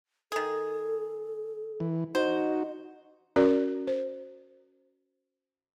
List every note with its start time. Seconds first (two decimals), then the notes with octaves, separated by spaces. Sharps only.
0.32 D#3 G#4 A4
1.80 E3
2.15 D#4 F#4 C5 D#5
3.36 C#4 F#4 A#4 D5
3.87 C5